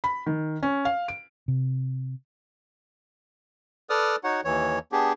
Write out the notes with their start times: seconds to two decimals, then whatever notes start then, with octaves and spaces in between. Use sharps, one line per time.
0.04 B5
0.26 D#3
0.63 C#4
0.85 F5
1.08 D7
1.48 C3
3.90 A4 B4 D5 D#6 F6
4.24 D#4 F#4 C#5 F#5
4.44 D#2 E3 C#5
4.92 B3 D4 G4 G#4